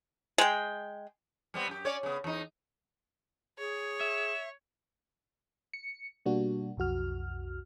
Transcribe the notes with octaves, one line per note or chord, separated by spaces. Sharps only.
G#3 G5
G3 B3 C4
F#2 G4
C#4 C#5 D5
C#3 B3
E2 D#4
G#4 C#5
E5 E7
C#7
B2 G3 A#3 D4 F#4
B1 F2 F#4 F6